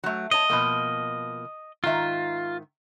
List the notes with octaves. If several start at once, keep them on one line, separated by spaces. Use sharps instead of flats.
F#3 A3
C#5 D#5 A5
B2 F3 A#3
G#2 D#3 F4 E5